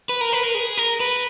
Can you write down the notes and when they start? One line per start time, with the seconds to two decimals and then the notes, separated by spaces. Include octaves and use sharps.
0.09 B4
0.21 A#4
0.33 B4
0.43 A#4
0.55 G#4
0.77 A#4
1.00 B4